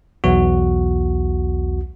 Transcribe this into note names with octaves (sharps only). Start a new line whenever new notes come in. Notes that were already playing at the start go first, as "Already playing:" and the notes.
B1 E2 F#4